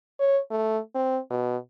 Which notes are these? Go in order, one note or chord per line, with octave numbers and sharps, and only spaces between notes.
C#5
A3
C4
B2